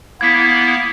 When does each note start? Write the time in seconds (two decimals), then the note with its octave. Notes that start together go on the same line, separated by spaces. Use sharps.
0.21 A#3 B3 E4 G#6 B6